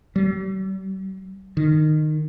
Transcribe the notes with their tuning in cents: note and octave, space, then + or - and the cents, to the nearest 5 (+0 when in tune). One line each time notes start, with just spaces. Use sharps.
G3 -45
D#3 -20